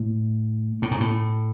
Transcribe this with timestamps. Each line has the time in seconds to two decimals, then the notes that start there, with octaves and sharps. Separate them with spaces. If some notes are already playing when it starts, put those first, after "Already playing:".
Already playing: A2
0.82 A2
0.91 G#2
1.00 A2